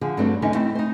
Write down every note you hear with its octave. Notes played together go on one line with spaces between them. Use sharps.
D3 F3 G#4
G2 F#3 G3 A3 C4 D4
E2 D3 C#4 D#4 A4 E5
A3 C4 E4
D#4 C5